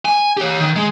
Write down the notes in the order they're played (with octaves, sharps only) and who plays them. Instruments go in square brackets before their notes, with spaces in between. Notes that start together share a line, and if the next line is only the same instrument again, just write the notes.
[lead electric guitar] G#5
G4 C#5
D#3
G#3